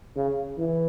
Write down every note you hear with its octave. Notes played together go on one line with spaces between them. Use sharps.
C#3
E3